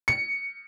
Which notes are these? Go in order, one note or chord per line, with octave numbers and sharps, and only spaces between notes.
C#7